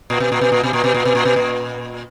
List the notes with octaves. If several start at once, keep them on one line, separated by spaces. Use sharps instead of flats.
A#2
B2
A#2
B2
A#2
B2
A#2
B2
A#2
B2
A#2
B2
A#2